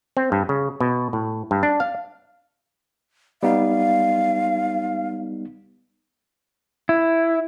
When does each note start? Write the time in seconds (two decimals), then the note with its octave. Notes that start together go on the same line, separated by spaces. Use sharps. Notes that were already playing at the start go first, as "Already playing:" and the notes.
0.17 C4
0.32 G2
0.49 C#3
0.80 B2
1.13 A2
1.51 G2
1.63 D4
1.80 F5
3.43 G3 B3 D#4 F5
6.89 E4